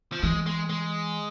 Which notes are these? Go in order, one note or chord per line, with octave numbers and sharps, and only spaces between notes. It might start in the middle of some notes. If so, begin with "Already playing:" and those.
F3
E3 G#3
G#3
G#3